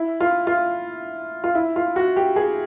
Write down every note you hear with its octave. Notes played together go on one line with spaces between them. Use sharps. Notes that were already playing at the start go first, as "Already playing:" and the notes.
Already playing: E4
F4
F4
F4
E4
F4
F#4
G4
G#4